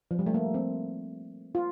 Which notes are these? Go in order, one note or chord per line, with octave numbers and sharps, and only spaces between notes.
F3
G3
A3
A#3
C4
F4